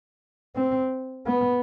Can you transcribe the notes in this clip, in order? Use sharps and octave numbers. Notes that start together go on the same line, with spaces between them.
C4
B3